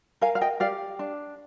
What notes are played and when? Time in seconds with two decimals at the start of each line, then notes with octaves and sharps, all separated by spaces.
0.21 A#4 F5 G#5
0.35 F5
0.41 D#5 G5
0.60 G4 D5 F5
0.99 D4